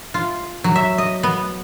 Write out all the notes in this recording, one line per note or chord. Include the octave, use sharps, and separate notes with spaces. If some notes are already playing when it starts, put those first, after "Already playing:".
F4
F#3
E5
D#5
B3